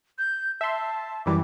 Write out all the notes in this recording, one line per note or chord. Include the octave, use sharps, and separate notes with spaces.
G6
E5 A5 C6
F#2 E3 G3 D6